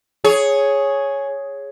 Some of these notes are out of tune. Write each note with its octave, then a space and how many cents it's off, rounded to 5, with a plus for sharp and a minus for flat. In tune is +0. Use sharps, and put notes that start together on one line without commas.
G#4 +5 C#5 +0